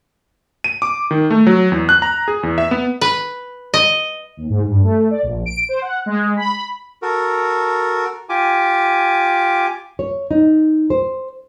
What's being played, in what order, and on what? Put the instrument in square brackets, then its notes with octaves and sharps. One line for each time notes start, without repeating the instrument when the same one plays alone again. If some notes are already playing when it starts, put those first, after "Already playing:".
[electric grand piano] D#7
D6
D#3
A3
F#3
E2
F#6
A#5
G#4
E2
E5
B3
[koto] B4
D#5
[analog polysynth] D#2
G#2
G2
A3
D5
A#1
D7
C5
F#5
G#3
B5
[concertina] F#4 A4 A#4
F4 G4 G#5 D6
[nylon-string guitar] C#5
D#4
C5